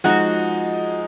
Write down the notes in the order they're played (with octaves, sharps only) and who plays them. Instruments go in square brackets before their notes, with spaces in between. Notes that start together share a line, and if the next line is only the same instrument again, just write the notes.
[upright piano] F3 G#3 D#4 [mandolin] F#4